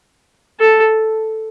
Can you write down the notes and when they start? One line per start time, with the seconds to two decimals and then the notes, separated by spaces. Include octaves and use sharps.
0.60 A4